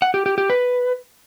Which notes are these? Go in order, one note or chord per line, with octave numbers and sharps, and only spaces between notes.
F#5
G4
G4
G4
B4